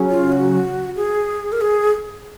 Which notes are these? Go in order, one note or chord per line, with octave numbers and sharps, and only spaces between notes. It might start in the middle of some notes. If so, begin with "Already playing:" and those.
Already playing: C#3 F#3 C#4
F4
F#4
G#4
A#4
G#4